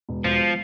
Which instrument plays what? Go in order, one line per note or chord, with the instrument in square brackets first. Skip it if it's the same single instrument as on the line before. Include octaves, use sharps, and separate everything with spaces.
[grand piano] E1
[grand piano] E1 [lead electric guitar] F3